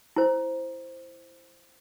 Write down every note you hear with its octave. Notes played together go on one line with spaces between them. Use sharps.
E4 C5